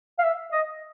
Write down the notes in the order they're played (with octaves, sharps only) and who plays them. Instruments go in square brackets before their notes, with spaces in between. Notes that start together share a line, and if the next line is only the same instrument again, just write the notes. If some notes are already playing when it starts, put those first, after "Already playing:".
[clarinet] F5
E5
D#5